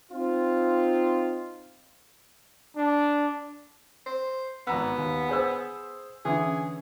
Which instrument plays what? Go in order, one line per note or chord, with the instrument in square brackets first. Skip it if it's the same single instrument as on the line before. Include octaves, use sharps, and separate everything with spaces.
[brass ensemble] C4 D#4 F4
[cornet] D4
[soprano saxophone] C5
[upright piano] G#1 A#5 E6 [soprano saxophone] B3
[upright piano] D#2
G#4 C5 E6
[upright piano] D3 E3 C#4 [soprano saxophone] G#4